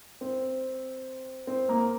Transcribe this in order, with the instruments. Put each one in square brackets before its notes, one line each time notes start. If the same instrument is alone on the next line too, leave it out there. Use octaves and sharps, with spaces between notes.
[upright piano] C4
C4
A#3